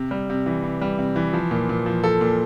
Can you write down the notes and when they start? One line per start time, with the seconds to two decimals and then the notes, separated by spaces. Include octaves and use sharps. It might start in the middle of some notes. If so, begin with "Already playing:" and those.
Already playing: C3
0.11 G3
0.30 C3
0.46 E3
0.63 C3
0.81 G3
0.99 C3
1.16 E3
1.33 F3
1.51 A#2
1.69 A#2
1.86 F3
2.04 F3 A4
2.21 A#2